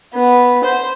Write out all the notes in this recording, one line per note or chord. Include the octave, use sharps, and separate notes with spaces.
B3
C5